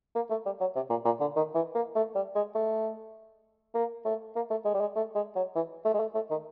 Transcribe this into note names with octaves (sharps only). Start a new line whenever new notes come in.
A#3
A3
G3
F#3
C3
A#2
A#2
D3
D#3
E3
A#3
A3
G3
G#3
A3
A#3
A3
A#3
A3
G#3
G3
G#3
A3
G#3
F#3
E3
A3
G#3
A3
A3
D#3